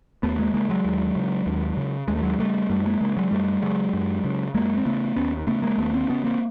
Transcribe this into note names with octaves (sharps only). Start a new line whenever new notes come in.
D#2 A3 B3
G#3 A#3
C#3 G#3 A#3
F#3 G#3
D#2
C#3
D#2
C#3
D#2 G#3
A3
F#3 G#3
C#3 G3 A3
F#2 G3 A3
G#3 A#3
C#3 G#3 A#3
F#3 G#3
F#2 G3 A3
C#3 F#3 G#3
F#2
C#3
F#2 G#3 A#3
C4
C#3 A3 B3
D#2 B3 C#4
C#3 A3 B3
G#3 A#3
D#2 A3 B3
A#3 C4
C#3 B3 C#4
A#3 C4